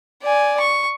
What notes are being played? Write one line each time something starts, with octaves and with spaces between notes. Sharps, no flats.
D5 G#5
C#6